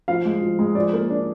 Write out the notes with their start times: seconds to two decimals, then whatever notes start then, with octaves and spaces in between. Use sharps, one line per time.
0.08 F3 F5
0.25 G#3
0.42 F3
0.59 G#3
0.75 F3 D5
0.93 A#3
1.10 D4